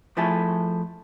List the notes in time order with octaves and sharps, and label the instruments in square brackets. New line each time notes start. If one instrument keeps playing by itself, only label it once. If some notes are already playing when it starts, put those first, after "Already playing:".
[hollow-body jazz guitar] F3 A3 E4 G#4 A4